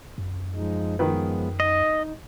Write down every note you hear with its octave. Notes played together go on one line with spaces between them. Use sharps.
F#2
F3 G#3 D#4
D#3 F3 G#3 B3 B4
D#4 D#5